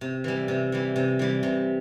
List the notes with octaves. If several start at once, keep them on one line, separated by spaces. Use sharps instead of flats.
C3
E3 G3
C3
E3 G3
C3
E3 G3
C3